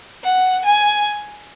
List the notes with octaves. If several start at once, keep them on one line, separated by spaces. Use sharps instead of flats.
F#5
G#5